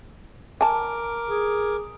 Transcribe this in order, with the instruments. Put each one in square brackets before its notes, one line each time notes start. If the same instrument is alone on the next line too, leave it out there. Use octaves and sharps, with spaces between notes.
[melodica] A#4 D6 [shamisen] G#5 A5
[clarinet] G#4